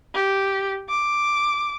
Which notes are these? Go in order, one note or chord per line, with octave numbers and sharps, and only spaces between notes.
G4
D6